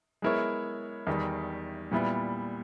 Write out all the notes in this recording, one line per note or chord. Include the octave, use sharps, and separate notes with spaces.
G#3 B3 E4 A#4 C#5
E2 D#3 G3
A#2 G3 B3 E4